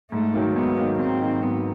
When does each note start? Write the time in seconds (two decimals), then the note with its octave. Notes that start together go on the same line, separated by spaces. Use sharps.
0.11 G#2 A3
0.34 D#3 F#3 A#3
0.55 G#2 B3
0.77 D#3 F#3 A#3
0.99 G#2 C4
1.22 D#3 F#3 A#3
1.43 G#2 B3